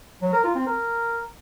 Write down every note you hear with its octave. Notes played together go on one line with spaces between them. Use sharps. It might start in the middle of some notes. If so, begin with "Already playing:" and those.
F#3
A#4
F4
C4
A#4